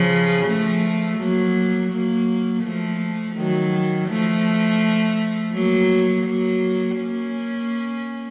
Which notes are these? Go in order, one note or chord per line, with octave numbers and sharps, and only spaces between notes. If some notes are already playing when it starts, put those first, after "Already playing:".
Already playing: C#3 F3
F3 A3
F#3 A#3
F#3 A#3
F3 A3
D#3 F#3
F3 A3
F#3 A#3
F#3 A#3
A#3 C#4